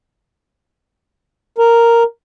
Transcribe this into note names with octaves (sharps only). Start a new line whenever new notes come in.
A#4